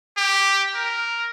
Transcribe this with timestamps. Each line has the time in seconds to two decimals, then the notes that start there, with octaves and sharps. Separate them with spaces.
0.18 G4
0.75 A#4